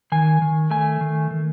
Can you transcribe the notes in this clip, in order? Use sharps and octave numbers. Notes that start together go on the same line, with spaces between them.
D#3 G#5
D#3
A3 G#5
D#3
D#3